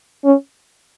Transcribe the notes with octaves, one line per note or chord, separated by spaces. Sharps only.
C#4